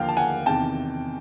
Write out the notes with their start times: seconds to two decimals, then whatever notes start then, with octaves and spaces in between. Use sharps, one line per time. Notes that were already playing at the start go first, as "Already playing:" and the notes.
Already playing: D#2 D3 F3 A#3 F5 G5
0.08 A5
0.17 F#5 G#5
0.46 E2 C3 D#3 G5 A5